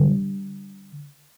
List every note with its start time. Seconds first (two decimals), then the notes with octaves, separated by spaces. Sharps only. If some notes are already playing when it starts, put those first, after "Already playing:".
Already playing: D3 G3